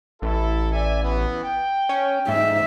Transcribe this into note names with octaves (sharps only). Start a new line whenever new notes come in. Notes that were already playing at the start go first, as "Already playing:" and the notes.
A1 E4 A4
D5 E5 G#5
E3 B3
G5
C#4
G#2 E5